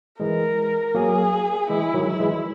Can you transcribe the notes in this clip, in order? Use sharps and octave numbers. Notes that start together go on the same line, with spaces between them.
E3 G#3 A#4
F#3 A#3 G#4
E3 G#3 E4
D#3 F#3
E4
E3 G#3